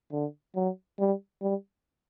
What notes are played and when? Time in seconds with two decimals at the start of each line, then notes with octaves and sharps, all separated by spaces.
0.12 D3
0.55 F#3
0.99 G3
1.42 G3